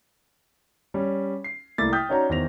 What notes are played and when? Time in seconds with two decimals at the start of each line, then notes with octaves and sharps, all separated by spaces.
0.94 G3 C#4
1.44 C7
1.78 C2 A3 A#3 E4 D6 A6
1.92 G5 D#6 F6 G6 A6 B6
2.09 C#4 D#4 F#4 C#5 D5 A#5
2.29 E2 D#3 C5 A#6 F7